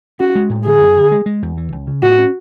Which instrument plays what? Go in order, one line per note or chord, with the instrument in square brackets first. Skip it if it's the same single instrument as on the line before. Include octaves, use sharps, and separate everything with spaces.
[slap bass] C#4 [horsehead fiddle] F#4
[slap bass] G#3
A2
[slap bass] D3 [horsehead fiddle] G#4
[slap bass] F#2
D3
G#3
G#3
E2
E3
C#2
C#3
[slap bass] A2 [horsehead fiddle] F#4
[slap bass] C#4